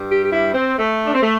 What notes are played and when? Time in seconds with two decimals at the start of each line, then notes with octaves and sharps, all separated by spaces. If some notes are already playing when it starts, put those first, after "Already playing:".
Already playing: G2 G3
0.10 G4
0.25 G4
0.32 E4
0.54 C4
0.78 A3
1.05 D4
1.13 C4
1.22 A3